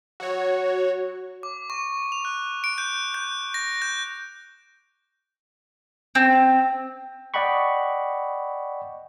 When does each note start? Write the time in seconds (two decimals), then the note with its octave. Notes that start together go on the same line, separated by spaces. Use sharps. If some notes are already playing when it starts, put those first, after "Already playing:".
0.20 F#3 F#4 C#5
1.43 D6
1.70 C#6
2.12 F7
2.25 F#6
2.64 D7
2.78 G6
3.14 G6
3.54 A#6
3.82 G6
6.15 C4
7.34 D5 D#5 F#5 G5 B5 C#6